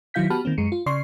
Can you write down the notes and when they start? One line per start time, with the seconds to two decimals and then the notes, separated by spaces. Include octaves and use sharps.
0.14 D#3 F#3 E4 F5 G6 B6
0.30 B3 F#4 G4 A5 B5 F6
0.45 D#3 A#3 C4
0.58 F#2 G#3 C#7
0.72 F4
0.86 C#3 D5 C6 C#6 C7